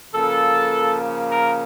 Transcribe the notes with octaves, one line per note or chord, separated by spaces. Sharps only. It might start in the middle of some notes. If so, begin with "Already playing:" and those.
C#3 F3 A#3 A4
A#4